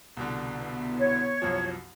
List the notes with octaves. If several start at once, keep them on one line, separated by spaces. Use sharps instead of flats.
C2 B2 D3
B3 E4
C#5
C2 F#2 F3